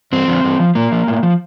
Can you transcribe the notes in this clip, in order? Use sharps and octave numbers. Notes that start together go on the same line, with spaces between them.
G2 C4
D3 F3
G2
F3
A#2 A#3
F3
A2
F3